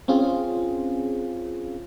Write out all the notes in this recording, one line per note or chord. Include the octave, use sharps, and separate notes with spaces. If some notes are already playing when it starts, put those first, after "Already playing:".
C4 C#4 F4 G#4